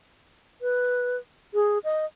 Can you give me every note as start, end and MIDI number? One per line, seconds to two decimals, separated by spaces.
0.62 1.17 71
1.54 1.78 68
1.84 2.05 75